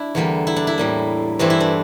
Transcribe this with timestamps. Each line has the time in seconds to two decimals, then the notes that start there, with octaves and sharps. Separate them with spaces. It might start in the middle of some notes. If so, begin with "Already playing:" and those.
Already playing: D4 E4
0.15 E2 D3 G3 A#3
0.47 E4
0.56 D4
0.67 E4
0.78 A2 G3 A#3
1.39 G2 E3 A3 C4 D4
1.50 E4
1.60 D4